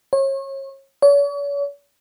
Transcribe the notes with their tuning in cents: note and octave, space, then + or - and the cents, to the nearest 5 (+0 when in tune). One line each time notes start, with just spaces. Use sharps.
C#5 -35
C#5 +40